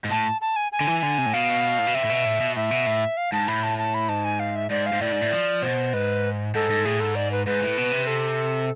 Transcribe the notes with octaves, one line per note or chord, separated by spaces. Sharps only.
G#2
A2 A5
A5
G#5
G#5
D3
E3
D3
C3
A2
B2 F5
A2
B2
C3 E5
A2
B2
A2
B2
A2 E5
B2
A2
F5
G#2 A5
A2 B5
A5
A5
B5
G#2 A5
G#5
F5
E5
G#2 D5
F5
G#2
A2 D5
G#2
A2
F3
B2 C5
G#2 B4
G#2 A4
G#2
A2 G#4
G#2 A4
D5
B4
G#2 B4
A2
B2
C3
A4